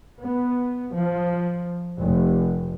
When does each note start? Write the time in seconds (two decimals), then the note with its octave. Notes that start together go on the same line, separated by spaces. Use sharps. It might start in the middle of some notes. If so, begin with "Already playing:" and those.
0.21 B3
0.94 F3
2.00 F1